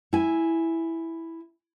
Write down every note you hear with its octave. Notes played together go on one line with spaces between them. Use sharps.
E4 G#5